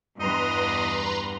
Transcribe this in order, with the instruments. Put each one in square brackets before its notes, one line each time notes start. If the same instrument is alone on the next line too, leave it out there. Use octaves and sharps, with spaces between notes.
[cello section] E2 G2 [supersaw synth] B4 A#5 C6 [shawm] D#5